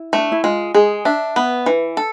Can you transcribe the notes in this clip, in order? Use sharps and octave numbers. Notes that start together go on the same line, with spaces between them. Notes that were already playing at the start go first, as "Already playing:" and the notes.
Already playing: E4
A3
D4
E4
G#3 F4
G#3 G#4
D4 E5
B3
E3
A4